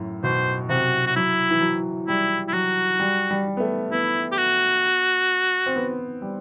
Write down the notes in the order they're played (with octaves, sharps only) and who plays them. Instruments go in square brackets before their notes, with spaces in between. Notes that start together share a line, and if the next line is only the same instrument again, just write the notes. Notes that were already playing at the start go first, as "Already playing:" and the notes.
Already playing: [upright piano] F#2 A2
[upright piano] B2 [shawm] C5
[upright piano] C3 [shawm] F#4
[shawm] F#4
[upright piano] F#3 [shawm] E4
[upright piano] E3
F#3
[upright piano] G3 [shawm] E4
[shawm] E4
[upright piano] F#3 [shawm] F#4
[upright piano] G3
G3
B3
A3
[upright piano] B3 [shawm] E4
[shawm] G4
F#4
[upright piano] C4
B3
G3